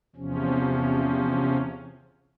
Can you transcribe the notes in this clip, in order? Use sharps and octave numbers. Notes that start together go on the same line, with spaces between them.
E2 C3 F3 C#4